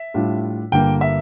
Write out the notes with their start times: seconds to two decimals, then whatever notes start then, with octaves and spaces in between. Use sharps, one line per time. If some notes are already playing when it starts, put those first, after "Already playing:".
Already playing: E5
0.14 A2 G3 D4 F4
0.72 G1 G2 D3 G3 A#3 G5
1.01 E5